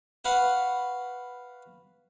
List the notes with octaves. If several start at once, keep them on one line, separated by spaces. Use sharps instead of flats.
F#4 B4 F5 F#5